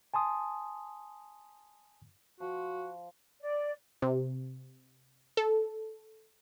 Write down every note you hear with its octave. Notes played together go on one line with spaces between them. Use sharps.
G#5 A5 C6 D#6
F3 F#4
D5
C3
A4